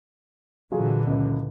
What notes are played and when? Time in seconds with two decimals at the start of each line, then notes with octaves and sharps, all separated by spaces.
0.72 A#2 D3 E3 F#3 F4 G#4
1.07 C#2 F#2